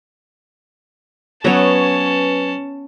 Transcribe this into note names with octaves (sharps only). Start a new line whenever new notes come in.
F#3 B3 C#4 B4 C#5 A5